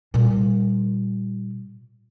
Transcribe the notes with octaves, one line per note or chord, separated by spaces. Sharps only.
A#2 G3